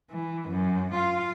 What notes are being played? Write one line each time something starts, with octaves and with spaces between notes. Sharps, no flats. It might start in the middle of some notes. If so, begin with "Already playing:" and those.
E3
F#2
F4 F5